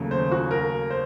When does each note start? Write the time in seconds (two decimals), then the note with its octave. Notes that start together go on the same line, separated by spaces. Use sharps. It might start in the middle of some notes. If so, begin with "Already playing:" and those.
Already playing: D#2 C#3 F#3 A3
0.11 C5
0.31 F#4
0.51 A#4
0.90 C5